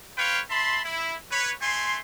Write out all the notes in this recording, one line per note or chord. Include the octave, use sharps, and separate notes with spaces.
F4 B4 C#5 F5 G5
E5 A5 B5 C6
E4
B4 C#5
A3 G#5 C6